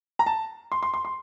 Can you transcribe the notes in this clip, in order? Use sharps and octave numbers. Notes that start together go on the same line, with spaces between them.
A#5
A5
C6
C6
C6
C6